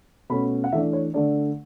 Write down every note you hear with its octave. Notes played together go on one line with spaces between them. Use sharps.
B2 A3 C#4 B5
F#5
E3 A3 D4 E5
C#5
D3 A3 D4 D5